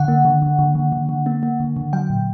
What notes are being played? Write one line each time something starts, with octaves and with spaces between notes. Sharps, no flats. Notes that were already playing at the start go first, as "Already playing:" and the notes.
Already playing: D3 F#5
A#3
D3
D3
D3
D3
D3
D3
A#3
A#3
D3
D3
F#3 G5
A#2